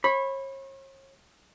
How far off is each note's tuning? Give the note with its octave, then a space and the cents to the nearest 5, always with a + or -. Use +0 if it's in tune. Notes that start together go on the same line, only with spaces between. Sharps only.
C#5 -40 B5 +0